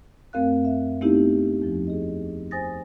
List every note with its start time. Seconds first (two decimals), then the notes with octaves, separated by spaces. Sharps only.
0.33 F#2 A3 C4 A#4 F5 F#6
0.65 E5
1.01 A3 B3 C4 D#4 E4 G4
1.62 E2 F3
1.87 G#4 D#5
2.51 C5 G#5 D#6 A6 A#6